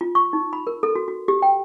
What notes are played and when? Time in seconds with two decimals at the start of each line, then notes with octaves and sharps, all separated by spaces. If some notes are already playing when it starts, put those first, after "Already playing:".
0.01 F4
0.15 C#6
0.33 D#4
0.53 B5
0.67 A#4
0.83 A4
0.95 F#4
1.08 F#4
1.28 G4
1.42 G5